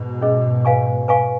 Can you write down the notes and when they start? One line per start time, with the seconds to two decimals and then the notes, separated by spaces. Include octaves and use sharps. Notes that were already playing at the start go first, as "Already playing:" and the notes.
Already playing: G#2 B2
0.22 C#4 G#4 D#5
0.65 B4 F5 G#5 C#6
1.08 B4 F5 G#5 C#6